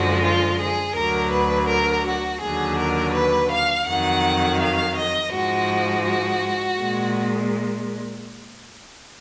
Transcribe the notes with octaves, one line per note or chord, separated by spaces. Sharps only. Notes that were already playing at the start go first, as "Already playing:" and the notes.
Already playing: F#2 D3 F3 G#3 F#4
F4
G#4
D2 D3 F#3 A#4
B4
A#4
F#4
D#2 D3 F#3 G#4
A#4
B4
F5
F2 D#3 F#3 F#5
F5
D#5
G#2 F3 G#3 F#4
F#4
A#2 G#3